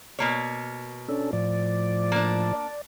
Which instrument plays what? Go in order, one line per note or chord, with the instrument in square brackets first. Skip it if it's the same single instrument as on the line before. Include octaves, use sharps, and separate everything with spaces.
[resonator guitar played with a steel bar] B2 A#3 C#5
[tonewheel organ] C#4 D4 A4
A2 F3 D5
[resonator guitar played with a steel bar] A#3 D4
[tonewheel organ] D5